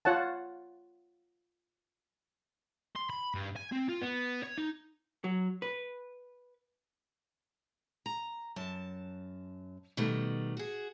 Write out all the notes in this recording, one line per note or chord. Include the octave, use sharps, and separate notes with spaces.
F4 C#5 F#5 A5
C6
B5
G2
G#5
C4
F4
B3
C#5
D#4
F#3
B4
A#5
F#2 A5
B2 D#3 G3 A3
F#4 G#4